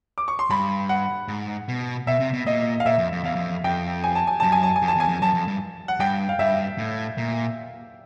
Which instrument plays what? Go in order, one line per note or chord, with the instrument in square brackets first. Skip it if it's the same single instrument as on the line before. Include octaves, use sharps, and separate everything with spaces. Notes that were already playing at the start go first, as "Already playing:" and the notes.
[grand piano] D6
C#6
C6
[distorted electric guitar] G2 [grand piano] B5
[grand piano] F#5
[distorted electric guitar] G#2
B2
[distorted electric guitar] B2 [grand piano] E5
[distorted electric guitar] C3
B2
[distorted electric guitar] A#2 [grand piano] D#5
[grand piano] F5
[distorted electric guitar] A#2 [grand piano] E5
[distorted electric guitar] F2
F2
[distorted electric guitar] E2 [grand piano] F5
[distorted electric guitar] F2
[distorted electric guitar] F2 [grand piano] G5
[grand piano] G#5
A5
G#5
[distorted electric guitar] F#2 [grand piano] A5
[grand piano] G#5
A5
G#5
[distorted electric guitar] F2
[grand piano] A5
[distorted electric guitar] E2
[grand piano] G#5
[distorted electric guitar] F2
[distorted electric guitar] F#2 [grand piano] A5
[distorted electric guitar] F2
G2
[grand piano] F#5
[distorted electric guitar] G2 [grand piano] G5
[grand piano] F5
[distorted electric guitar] G2 [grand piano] E5
[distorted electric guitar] A2
A#2